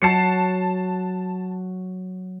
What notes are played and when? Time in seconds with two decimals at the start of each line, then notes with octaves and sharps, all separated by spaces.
0.02 F#3 A5 C7 C#7